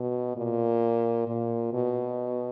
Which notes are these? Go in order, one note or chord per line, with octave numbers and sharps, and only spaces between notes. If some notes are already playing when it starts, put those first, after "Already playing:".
Already playing: B2
A#2
A#2
B2